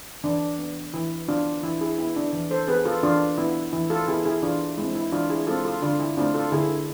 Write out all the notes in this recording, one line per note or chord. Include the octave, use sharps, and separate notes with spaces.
E3 D4
B3
E3 E4
B3 D4 F4
E3 E4
E4 G#4
B3 E4
D4
E3
A4 C5
B3 G#4 B4
F4 A4
E3 D4 F4
B3 E4
E3 E4
F4 A4
B3 E4 G#4
E4 G#4
E3 D4 F4
G#3 C4 E4
E4
E3 D4 F4
E4 G#4
G#3 C4 F4 A4
F4 A4
D3 D4 F4
E4
A3 C4 D4 F4
F4 A4
D3 E4 G#4